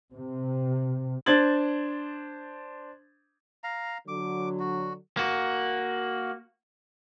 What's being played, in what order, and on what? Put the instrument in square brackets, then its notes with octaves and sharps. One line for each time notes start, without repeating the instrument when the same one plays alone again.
[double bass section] C3
[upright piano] D4 C5 G#6 A6 F#7
[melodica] F5 A#5
[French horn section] D3 F#3 [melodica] D6
[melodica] F#4
[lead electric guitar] A#3 F#4